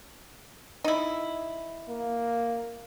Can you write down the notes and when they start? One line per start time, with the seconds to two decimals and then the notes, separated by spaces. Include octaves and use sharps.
0.84 D#4 E4
1.90 A#3